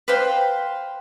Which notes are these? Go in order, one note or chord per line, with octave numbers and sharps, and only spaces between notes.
B4 C5 F5 G5